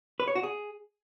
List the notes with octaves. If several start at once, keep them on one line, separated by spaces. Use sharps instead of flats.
B4
C#5
F#4
G#4